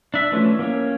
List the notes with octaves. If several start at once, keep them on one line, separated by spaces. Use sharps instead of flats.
D4 E5
E3 F3 A3 C#4
A#3 C#4